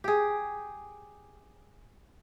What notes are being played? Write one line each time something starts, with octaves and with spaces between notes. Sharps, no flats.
G4 G#4